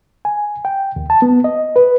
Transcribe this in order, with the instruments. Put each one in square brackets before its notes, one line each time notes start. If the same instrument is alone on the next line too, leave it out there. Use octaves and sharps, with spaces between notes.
[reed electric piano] G#5
G5
D#2
A5
B3
D#5
B4